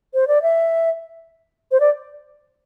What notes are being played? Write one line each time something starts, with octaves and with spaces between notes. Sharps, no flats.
C5
D5
E5
C5
D5